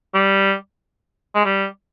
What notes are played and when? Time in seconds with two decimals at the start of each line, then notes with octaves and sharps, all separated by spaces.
0.14 G3
1.35 G#3
1.45 G3